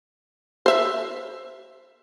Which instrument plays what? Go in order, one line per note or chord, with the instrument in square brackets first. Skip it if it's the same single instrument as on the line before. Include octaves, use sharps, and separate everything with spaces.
[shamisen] C5 E5